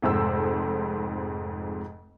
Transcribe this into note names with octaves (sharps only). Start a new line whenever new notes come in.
F1 F2 G#2 C5 E6